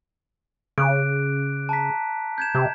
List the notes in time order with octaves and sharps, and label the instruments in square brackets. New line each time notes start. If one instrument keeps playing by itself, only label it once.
[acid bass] C#3 [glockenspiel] D6 F#6 D7
[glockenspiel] A5 A#5 B6
G6 G#6 E7
[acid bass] C3